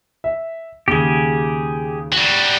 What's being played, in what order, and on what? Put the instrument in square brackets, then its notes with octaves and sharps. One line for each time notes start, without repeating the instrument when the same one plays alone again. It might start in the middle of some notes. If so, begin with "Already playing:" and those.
[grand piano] E5
[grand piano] D#2 C#3 G7 [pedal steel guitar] G4 G#4
[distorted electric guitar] G3 F#4